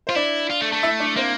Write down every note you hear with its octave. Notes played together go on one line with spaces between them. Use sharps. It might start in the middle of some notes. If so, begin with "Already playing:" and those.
F4 C5
D4 E4 D5
F4
A3
A3
E4 E5
D4 D5
A#3 C4 C5